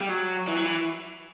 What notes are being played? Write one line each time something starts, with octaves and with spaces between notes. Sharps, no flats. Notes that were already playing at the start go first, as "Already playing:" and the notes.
G3
F#3
E3
F#3
E3